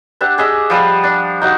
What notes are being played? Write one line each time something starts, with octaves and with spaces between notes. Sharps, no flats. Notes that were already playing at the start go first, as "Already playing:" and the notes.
D4 G4 E5 F#5
G#4 D#5 E5 D6
F3 G3 F5 F#5
D4
D#4 F#4 F#5